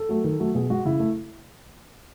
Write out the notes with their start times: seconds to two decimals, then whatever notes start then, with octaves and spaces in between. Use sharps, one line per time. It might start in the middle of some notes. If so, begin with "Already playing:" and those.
Already playing: A4
0.09 F#3 A3
0.24 D#3
0.40 F#3 A3
0.54 B2 G#4
0.70 G#3 F#4
0.85 C#3 E4
1.00 A3